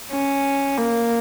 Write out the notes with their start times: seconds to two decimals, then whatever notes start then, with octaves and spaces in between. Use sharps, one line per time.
0.11 C#4
0.78 A#3